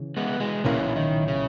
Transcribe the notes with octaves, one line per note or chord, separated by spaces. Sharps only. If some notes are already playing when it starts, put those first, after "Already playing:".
Already playing: C#3 E3
G#3 B3
E3 G#3
B1 A#2 C#3 E3 A#3 C#4 E4
D#3
C#3